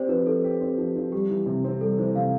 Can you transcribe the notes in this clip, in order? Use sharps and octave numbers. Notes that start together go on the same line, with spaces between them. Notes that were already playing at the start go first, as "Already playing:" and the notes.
Already playing: C4 G4 C5 D5
F3 B4
F3 A4
G4
C4
F3
F3
G3 G4
E3
C3
C4
G3 A4
E3 C5
C3 F5